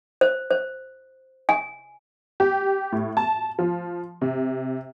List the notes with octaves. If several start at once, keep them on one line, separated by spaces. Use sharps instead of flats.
C5
C5
G#5
G4
A2
A5
F3
C3